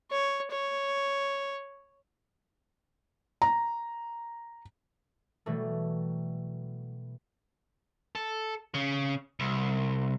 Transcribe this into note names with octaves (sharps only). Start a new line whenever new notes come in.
C#5
C#5
A#5
B2 E3 F#3 G3 A3
A4
C#3
C2